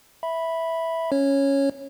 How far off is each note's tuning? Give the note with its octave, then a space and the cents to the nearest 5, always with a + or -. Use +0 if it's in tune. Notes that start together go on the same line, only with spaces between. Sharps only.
E5 -5 B5 -5
C#4 +0 C#5 -10